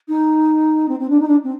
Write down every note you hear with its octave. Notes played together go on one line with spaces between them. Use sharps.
D#4
C4
C4
D4
D#4
D4
C4